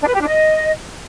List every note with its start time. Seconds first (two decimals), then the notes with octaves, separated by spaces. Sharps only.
0.01 D4
0.07 B4
0.14 G4
0.21 D4
0.28 D#5